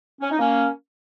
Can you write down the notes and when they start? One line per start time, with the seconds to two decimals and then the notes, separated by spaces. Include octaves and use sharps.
0.20 C#4
0.30 D#4
0.38 A#3 C#4